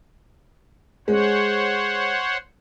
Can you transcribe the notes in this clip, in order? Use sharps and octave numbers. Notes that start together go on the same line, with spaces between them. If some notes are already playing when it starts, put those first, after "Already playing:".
G#3 C5 C#5 F#5